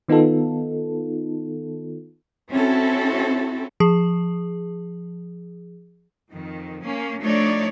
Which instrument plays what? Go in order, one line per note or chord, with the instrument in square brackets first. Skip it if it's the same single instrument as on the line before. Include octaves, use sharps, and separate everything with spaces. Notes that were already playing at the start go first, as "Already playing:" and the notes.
[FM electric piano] D#3 B3 D#4 F4 A4
[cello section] C4 C#4 E4 F#4 A4
[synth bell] F3 G#4
[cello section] F2 D#3
A#3 C#4
F3 A3 D4 D#4 C#5 D5